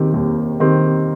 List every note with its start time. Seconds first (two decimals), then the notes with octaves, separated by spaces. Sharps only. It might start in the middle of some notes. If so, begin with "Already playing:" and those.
Already playing: D#2 D#3 C4 G4
0.14 D#2
0.60 D#3 C4 G4